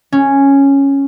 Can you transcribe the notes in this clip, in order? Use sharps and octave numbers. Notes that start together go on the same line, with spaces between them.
C#4